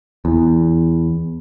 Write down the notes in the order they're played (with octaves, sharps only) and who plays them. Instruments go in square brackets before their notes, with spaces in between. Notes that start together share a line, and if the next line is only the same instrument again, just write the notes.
[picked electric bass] E2